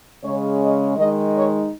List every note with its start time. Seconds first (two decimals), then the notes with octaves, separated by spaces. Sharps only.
0.23 C#3 G#3 C#4 C#5
0.60 D#5
0.97 D#3 G#3 D#4 D#5
1.35 C#5